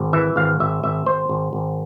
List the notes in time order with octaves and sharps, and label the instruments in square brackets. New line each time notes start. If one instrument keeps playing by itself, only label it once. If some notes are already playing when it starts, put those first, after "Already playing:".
Already playing: [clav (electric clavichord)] G#1
E3 E5
G#1 F5
G#1 E5
G#1 E5
G#1 C5
G#1
G#1